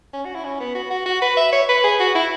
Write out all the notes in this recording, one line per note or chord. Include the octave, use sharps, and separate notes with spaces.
C#4
F#4
E4
C#4
B3
F#4
F#4
F#4
B4
E5
C#5
B4
G#4
F#4
E4